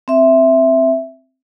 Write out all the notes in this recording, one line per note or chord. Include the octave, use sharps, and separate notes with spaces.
C4 E5